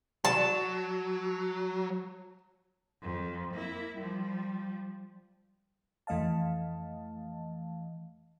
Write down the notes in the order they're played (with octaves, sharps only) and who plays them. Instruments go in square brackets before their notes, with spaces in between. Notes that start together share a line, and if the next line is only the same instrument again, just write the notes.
[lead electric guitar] F#3 [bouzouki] A5
[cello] F2 F3
A#3 E4
F3 G3
[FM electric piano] F2 E3 A3 D#5 F5 A5